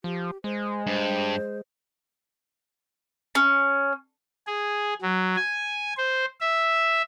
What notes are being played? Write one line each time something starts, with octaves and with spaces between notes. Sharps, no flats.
F3 G4
G#3 C5
G2 C5
C#4
G#4
F#3
G#5
C5
E5